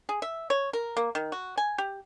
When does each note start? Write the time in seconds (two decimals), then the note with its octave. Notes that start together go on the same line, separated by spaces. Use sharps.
0.09 G#4
0.22 E5
0.50 C#5
0.73 A#4
0.97 A#3
1.15 D#3
1.32 F#4
1.57 G#5
1.78 G4